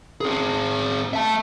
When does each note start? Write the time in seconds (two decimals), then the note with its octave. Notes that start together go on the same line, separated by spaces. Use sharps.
0.21 C4 G#4
1.13 E5 A5